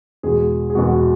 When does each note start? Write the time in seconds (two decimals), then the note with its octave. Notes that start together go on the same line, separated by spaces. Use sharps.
0.23 E2 B2 G#3 G#4
0.70 G#4
0.75 E2 B2 G#3 F#4
0.92 F#4